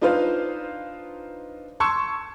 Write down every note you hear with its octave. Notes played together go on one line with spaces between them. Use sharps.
D4 D#4 F4 B4 C5 F5
A5 C6 C#6 E6 G#6 C#7